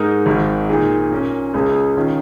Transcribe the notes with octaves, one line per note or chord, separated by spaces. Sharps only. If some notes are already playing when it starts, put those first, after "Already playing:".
Already playing: G#2 G#3 D#4 A#4
G#1 G#2 D#3
A#2 A#3 D#4 G#4
A#2 A#3 C#4 A#4
C#2 C#3 G#3 C#4 G#4
D#3 C#4 F4